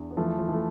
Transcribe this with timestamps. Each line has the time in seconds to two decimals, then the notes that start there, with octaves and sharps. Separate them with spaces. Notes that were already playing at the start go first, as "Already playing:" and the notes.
Already playing: E2 D4
0.11 B3
0.17 E3 F3 A3
0.38 F3
0.48 E3 A3